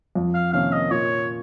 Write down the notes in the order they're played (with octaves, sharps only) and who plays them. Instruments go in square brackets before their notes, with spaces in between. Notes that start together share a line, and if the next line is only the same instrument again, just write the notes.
[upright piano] F2
[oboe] F5
[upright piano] C3 D#3 A#3 C#4 [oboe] F5
[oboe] D#5
[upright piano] A#2 [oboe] C#5